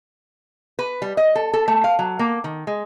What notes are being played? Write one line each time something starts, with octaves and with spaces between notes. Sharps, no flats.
B4
G3
D#5
A4
A4
A3
F5
F#3
A#3
D#3
G#3